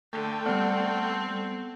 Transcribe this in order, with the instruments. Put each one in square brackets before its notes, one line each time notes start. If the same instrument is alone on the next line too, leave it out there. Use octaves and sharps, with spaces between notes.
[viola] D3 [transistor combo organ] A3 G5
[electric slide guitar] G3 C5 D5 [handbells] B3 F#5 F6 [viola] C4 A4